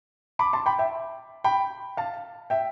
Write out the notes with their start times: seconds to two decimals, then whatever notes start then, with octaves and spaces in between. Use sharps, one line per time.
0.39 B5 D6
0.53 A5 C6
0.66 G5 B5
0.79 E5 G5
1.44 G5 B5
1.97 F5 A5
2.50 E5 G5